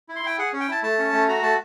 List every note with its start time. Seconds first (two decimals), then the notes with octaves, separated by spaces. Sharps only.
0.09 E4
0.16 C6
0.23 E4 G5
0.38 G#4 F#5
0.53 C#4
0.60 G5
0.68 E4 A5
0.83 A3 A5
0.99 C#4
1.13 A3
1.28 F#4 A#5
1.43 A3 A5